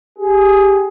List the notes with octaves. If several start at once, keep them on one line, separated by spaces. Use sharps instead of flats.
G4 G#4